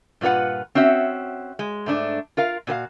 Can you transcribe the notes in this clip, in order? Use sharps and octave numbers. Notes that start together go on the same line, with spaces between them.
G2 A#2 F4 B4 F#5
C4 C#4 F#4 E5
G#3
G#2 A3 D4
F4 A#4 F5
A#2 F#4 B4 F5